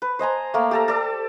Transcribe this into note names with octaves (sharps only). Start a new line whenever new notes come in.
B4
C5 D#5 G#5 A#5
A3 A#3
G4 A4 A#5
A4 D5